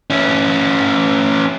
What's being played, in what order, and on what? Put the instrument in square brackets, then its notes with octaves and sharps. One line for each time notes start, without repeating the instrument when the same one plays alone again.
[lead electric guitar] C#4 E4